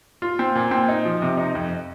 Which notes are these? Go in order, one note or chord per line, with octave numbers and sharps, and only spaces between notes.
F4
C4
A#2
C4
D#4
F3
C3
D#4
F2